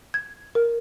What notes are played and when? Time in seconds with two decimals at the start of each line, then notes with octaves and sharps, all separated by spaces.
0.14 G#6
0.55 A#4